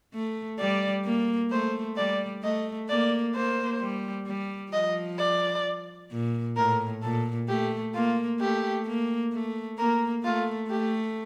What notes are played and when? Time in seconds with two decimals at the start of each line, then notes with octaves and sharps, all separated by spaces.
0.14 A3
0.59 G3 D5
1.06 A#3
1.51 A3 C5
1.97 G3 D5
2.43 A3 D#5
2.90 A#3 D5
3.35 A#3 C5
3.81 G3
4.27 G3
4.72 F3 D#5
5.19 D5
6.11 A#2
6.57 A2 A#4
7.03 A#2 A4
7.48 A3 G4
7.94 A#3 F4
8.40 A3 G4
8.87 A#3
9.33 A3
9.78 A#3 A#4
10.24 A3 F4
10.70 A3 G4